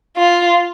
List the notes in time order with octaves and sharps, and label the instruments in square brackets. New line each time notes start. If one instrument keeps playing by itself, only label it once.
[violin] F4